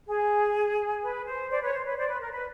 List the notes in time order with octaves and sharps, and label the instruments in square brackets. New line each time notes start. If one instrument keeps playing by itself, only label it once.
[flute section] G#4
B4
C5
C5 D5
B4 C#5
C5
B4 C#5
C5 D5
B4
A#4
B4